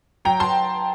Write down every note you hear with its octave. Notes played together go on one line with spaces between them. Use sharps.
F#3 G5 A#5
F#3 A5 C6